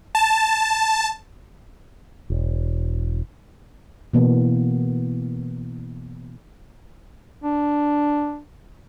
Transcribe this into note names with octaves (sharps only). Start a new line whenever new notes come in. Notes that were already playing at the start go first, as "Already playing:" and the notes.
A5
E1
B2 E3 A#3 B3
D4